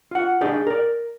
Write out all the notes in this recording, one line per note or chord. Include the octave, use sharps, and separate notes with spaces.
F4 F#5
D4 D#4 G4 G#4 D5
A#4 D5